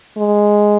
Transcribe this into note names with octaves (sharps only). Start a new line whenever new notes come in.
G#3